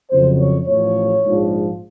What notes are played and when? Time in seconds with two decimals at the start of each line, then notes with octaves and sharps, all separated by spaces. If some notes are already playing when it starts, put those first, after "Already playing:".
0.10 F2 C#3 F#3 C5
0.38 C#5
0.67 A1 A2 F3 C#5
1.23 A#1 G#2 F3